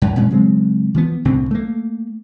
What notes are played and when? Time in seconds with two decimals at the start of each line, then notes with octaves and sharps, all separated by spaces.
0.02 F#2
0.16 A#2 F3 G#3 C#4
0.30 C#3 F#3 G#3 C4
0.94 E3 F3 B3
1.25 C2 A2 D3 C4
1.51 A3 A#3